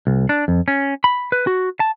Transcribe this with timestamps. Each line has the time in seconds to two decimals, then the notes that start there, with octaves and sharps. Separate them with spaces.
0.07 C2
0.29 D4
0.48 F2
0.68 C#4
1.04 B5
1.32 B4
1.47 F#4
1.80 A5